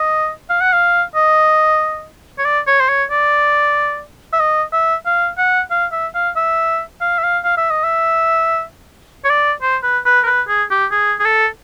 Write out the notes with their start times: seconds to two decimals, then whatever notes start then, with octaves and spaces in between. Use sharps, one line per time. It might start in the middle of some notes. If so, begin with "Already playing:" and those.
Already playing: D#5
0.50 F5
0.61 F#5
0.73 F5
1.16 D#5
2.39 C#5
2.45 D5
2.67 C#5
2.81 C5
2.89 C#5
3.11 D5
4.33 E5
4.40 D#5
4.73 E5
5.06 F5
5.38 F#5
5.71 F5
5.92 E5
6.15 F5
6.36 E5
7.01 F5
7.19 E5
7.24 F5
7.44 F5
7.58 E5
7.71 D#5
7.84 E5
9.25 C#5
9.30 D5
9.62 C5
9.84 B4
10.06 B4
10.23 A#4
10.26 B4
10.48 G#4
10.71 G4
10.92 G#4
11.20 G#4
11.25 A4